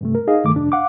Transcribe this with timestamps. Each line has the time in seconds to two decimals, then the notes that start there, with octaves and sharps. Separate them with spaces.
0.01 G2 C3 A3
0.15 A#4
0.28 D#4 G#4 D#5 F5
0.43 G2 D#3 A3 D6
0.55 F2 C3 D4
0.72 F5 F#5 D6